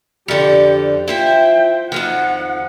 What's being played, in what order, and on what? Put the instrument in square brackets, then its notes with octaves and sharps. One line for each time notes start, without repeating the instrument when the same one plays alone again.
[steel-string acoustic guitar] F2 D3 [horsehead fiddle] G4 D5
[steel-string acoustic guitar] E4 C5 E5 [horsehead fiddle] F4 G5
[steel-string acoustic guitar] F2 D#3 F3 [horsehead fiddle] F#5